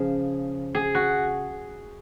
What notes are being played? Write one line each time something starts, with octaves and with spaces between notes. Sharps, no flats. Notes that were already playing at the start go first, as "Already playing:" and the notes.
Already playing: C#3 F3 G#4
G#4
F#4